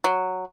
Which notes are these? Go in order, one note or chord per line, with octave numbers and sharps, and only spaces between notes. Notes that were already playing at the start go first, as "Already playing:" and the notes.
F#3